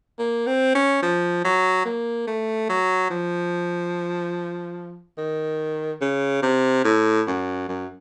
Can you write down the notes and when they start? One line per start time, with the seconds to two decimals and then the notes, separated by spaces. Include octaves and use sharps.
0.19 A#3
0.47 C4
0.75 C#4
1.02 F3
1.44 F#3
1.85 A#3
2.27 A3
2.69 F#3
3.10 F3
5.18 D#3
6.01 C#3
6.42 C3
6.84 A2
7.27 F#2
7.68 F#2